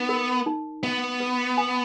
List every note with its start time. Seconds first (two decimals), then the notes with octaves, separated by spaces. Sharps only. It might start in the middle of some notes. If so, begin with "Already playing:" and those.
Already playing: B3 D#4
0.09 A#4
0.46 D#4
0.83 B3 E5
1.20 B4
1.57 G#5